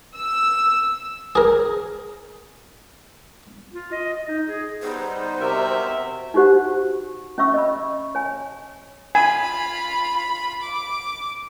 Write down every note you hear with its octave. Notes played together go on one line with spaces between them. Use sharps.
E6
G#4 A#4
F4
D#5
D#5
D#4
G#4
G3 B3 D#4 C5
C3 F#4 A#4 E5
D#4 F#4 G4 C5 F#5
C#4 C#5 E5 C#6 E6
D#5 B5
C#5 G#5
F4 G#5 B5
D6